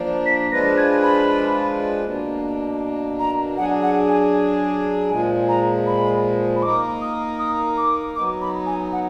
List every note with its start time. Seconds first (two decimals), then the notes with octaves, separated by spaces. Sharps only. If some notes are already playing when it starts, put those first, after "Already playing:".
Already playing: F3 A#3 D4
0.26 B6
0.52 F3 G#3 D4 F4 B4 A#6
0.77 G#6
1.03 B5
2.05 B2 A#3 D4
3.19 A#5
3.57 F#3 D4 G#4 F#5
3.83 F#5
4.09 G#5
5.10 A#2 F3 G#3 G#5
5.49 A#5
5.86 B5
6.56 B5
6.63 A#3 D#4 A#4 D6
7.01 D#6
7.39 D#6
7.77 D6
8.15 F#3 B3 D#4 D6
8.41 B5
8.66 G#5
8.92 F#5